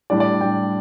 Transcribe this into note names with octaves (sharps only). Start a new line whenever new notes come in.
A2 G3 D4 D5
D5
A2 G3 D4 G5